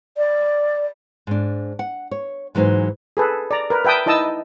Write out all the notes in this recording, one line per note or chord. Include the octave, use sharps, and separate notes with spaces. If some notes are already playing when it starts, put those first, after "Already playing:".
D5
G#2 D4
F#5
C#5
G#2 E3 F#3 D#4 C5
G#4 A4 B4
D5 A#5
A#4 B4
B4 E5 G5 A5 D#6
D#4 E4 D#5 A5 D#6 E6